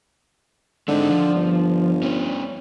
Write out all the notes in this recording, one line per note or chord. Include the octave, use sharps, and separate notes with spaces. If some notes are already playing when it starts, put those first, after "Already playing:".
D3 G#3 C4 D#4
F3
G1
B3 C#4